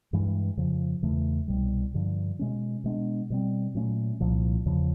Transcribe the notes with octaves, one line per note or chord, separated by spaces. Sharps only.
G2 E3 G#3
F2 C#3 F3
E2 C#3 E3 A3
C2 B2 G3
G2 D3 F3
B2 G#3 C#4
B2 G#3 B3 D4
B2 G3 C4
A#2 F#3 A3 C#4
C2 A#2 F3
E2 C#3 F3